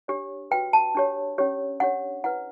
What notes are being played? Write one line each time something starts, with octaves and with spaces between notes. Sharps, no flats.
D4 G4 C#5
F#4 B4 G5
A5
D4 G4 C#5
C#4 G4 C#5
D4 G4 C#5 F#5
E4 B4 F#5